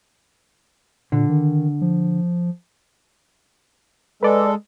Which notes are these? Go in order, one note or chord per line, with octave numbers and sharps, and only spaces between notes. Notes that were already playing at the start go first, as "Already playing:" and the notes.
A#2 D3
D#3
F3
G#3 A4 B4 D5